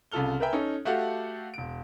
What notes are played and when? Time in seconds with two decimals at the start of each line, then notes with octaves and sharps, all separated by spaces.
0.12 C2 C#3 F4 A4 F6 G7
0.40 A#4 B4 E5 G5 G#5
0.53 C#4 D#4 A4
0.85 A3 F#4 G4 A4 F5 F#5
1.54 E1 D7